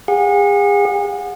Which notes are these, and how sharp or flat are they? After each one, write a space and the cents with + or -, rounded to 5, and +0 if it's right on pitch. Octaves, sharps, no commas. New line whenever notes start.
G#4 -40 F#5 -35